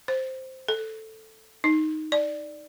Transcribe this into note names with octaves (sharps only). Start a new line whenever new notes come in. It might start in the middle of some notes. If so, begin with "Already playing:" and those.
C5
A4
D#4
D5